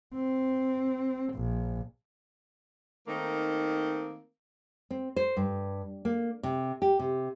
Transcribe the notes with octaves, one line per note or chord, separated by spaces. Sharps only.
C4
A#1
D#3 A3 A#3 C4 D#4
C4
C5
G2
A#3
C3
G4
C3